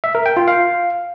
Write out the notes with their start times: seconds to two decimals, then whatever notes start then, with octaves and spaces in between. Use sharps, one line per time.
0.04 E5
0.15 A#4
0.26 G5
0.37 F4
0.48 F5